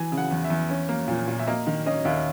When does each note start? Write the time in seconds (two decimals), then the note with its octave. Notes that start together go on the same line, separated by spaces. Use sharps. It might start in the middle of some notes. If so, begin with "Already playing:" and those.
Already playing: E3 G#5
0.12 C#3
0.18 F#5
0.31 E2
0.44 E5
0.50 E2
0.70 C#4
0.89 A#3
1.08 A#2
1.28 A#2
1.39 E5
1.47 A#3 D#5
1.67 D#3
1.86 C#4 D#5
2.05 D#2 E5